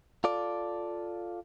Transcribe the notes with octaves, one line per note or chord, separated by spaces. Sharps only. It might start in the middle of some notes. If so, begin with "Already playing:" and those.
F4 A4 D5